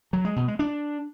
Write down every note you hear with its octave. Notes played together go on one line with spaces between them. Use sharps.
F#3
G#3
B2
G#3
D4